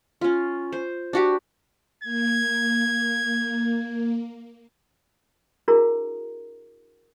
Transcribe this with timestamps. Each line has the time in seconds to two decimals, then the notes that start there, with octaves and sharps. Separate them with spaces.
0.21 C#4 F4
0.72 C5
1.13 D4 F#4 G4
2.04 A#3 G#6
5.68 D4 E4 F#4 G#4 A#4 A#5